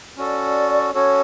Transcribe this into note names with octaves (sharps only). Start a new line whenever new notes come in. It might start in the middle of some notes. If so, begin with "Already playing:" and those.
C#4 F#4 A4 D5
C#4 F#4 A4 C#5